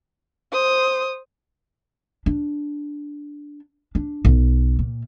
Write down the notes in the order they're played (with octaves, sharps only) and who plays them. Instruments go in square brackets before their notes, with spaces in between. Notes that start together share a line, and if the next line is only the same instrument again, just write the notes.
[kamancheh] C5 D#6
[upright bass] D4
D4
B1
A#2